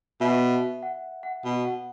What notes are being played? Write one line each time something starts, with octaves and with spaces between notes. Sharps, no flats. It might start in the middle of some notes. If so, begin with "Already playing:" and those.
B2 E5
F#5
F#5
B2 F#5
F#5